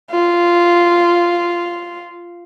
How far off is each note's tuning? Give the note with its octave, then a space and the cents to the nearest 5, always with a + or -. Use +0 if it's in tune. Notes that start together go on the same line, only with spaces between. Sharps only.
F4 -10